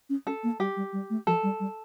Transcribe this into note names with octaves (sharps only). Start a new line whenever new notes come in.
C#4
C#4 A4
A#3
G3 G4
G3
G3
A3
F3 A4
G3
G3